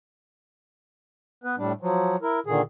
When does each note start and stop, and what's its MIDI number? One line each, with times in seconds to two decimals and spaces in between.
1.44 1.56 59
1.44 1.56 71
1.57 1.72 45
1.57 1.72 55
1.57 1.72 62
1.81 2.16 53
1.81 2.16 54
2.22 2.40 64
2.22 2.40 70
2.46 2.62 46
2.46 2.62 50
2.46 2.62 51
2.46 2.62 68